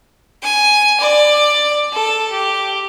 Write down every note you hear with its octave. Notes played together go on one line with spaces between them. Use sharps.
G#5
D5
A4
G4